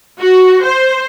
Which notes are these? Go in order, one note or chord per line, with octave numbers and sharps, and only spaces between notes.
F#4
C5